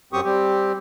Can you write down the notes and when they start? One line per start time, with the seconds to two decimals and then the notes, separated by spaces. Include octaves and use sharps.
0.13 F#2 F#3 C4 G4 C#6 D#6
0.24 G3 C4 G4